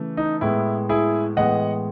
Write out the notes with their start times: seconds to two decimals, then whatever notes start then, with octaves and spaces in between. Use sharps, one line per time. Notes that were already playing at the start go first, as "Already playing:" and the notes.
Already playing: C#3 E3 A3
0.17 D#4
0.41 A2 G#3 B3 E4
0.89 E4 G#4
1.36 A2 E3 G#3 B3 D#5 F#5